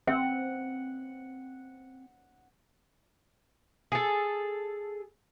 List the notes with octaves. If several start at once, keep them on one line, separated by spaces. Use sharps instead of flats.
C4 F#5
G#4 A4